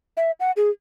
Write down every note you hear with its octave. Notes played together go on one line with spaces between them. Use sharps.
E5
F#5
G#4